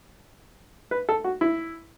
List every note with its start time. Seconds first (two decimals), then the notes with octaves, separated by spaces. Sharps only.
0.91 B4
1.09 A4
1.24 F#4
1.41 E4